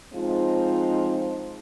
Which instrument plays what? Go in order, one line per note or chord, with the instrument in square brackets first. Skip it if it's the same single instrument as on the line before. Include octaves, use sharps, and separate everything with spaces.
[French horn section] F3 G#3 C4 D#4 F4